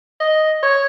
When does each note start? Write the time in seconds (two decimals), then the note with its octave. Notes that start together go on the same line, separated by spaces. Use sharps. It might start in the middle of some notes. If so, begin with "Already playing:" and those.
0.20 D#5
0.63 C#5